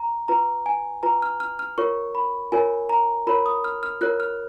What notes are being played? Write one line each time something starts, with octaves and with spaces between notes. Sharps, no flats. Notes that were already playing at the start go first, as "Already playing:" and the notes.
Already playing: A#5
F4 B4 A#5
G#5
F4 B4 A#5
F6
F6
F6
F4 A#4 C#5 C#6
B5
F4 A#4 C#5 G#5
A#5
F4 A#4 C#5 B5
D#6
F6
F6
F4 A#4 C#5 F#6
F6